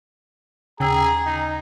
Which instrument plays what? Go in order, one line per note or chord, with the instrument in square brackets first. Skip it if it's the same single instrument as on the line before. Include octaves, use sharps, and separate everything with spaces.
[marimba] D#2 G5 E6 [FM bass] C#3 [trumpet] G#4 [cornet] A#5
[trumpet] D#4